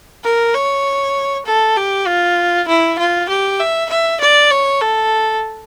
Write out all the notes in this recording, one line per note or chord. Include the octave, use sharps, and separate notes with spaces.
A#4
C#5
A4
G4
F4
E4
F4
G4
E5
E5
D5
C#5
A4